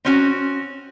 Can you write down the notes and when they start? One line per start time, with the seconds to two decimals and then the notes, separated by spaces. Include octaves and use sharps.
0.05 C4 C#4 F#4